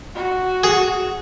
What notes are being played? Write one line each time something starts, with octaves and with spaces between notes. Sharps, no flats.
F#4
G#4